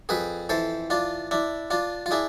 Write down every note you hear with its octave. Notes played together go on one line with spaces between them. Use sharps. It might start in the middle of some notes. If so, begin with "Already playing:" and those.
F2 G#4 B4
E3 A4 C5
D4 F4
D4 E4
D4 F4
F4
D4 E4 G#4